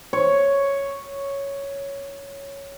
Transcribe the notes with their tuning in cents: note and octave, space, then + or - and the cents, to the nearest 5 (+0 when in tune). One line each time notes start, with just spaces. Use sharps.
C#5 +0